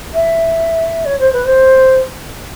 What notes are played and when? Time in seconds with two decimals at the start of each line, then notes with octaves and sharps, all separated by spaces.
0.14 E5
1.05 C#5
1.20 C5
1.33 B4
1.45 C5